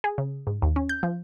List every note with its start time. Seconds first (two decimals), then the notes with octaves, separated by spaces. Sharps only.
0.04 G#4
0.18 C#3
0.47 G#2
0.62 D#2
0.76 C#4
0.89 G6
1.03 F3